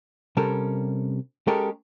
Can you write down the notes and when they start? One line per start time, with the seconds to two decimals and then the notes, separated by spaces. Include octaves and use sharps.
0.37 C3 G3 C#4 A4 A#4
1.47 G#3 C#4 G4 A4 A#4